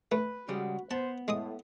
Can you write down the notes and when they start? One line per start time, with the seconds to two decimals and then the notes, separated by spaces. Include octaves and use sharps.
0.12 A3 B4
0.48 C#3 G3 G#3 F#4
0.91 B3 C5 A5
1.28 A2 G#3 D#5 D#6